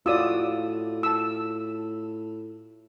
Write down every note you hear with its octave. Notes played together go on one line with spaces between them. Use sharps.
A2 F4 F#4 D5 D#6 E6
A5 E6